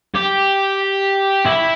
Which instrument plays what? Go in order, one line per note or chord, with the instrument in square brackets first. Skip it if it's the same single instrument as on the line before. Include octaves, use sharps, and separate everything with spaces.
[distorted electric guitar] G4
E4